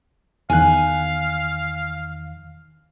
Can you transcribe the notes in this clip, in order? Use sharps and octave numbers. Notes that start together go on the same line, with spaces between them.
E2 D#3 F5 G#5 F#6